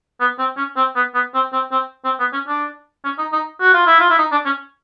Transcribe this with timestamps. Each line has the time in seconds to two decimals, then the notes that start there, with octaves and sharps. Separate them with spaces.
0.20 B3
0.39 C4
0.57 C#4
0.76 C4
0.96 B3
1.14 B3
1.34 C4
1.53 C4
1.72 C4
2.04 C4
2.19 B3
2.33 C#4
2.48 D4
3.05 C#4
3.18 D#4
3.33 D#4
3.61 F#4
3.74 F4
3.87 E4
4.00 F4
4.10 E4
4.18 D#4
4.32 D4
4.45 C#4